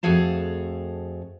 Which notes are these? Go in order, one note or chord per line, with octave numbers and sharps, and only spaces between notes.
F2 A3 F#4 G#4 F5 A5